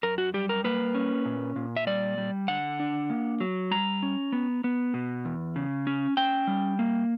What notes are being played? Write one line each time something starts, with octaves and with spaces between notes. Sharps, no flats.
F#2 A#4
F#4
G3 G4
A#4
A#3 B4
C#4
A#2
A#2
E5
G3 D5
G3
D3 F#5
D4
A#3
F#3
G3 A#5
C#4
B3
B3
B2
E2
C#3
C#4
C#4 G5
G3
A#3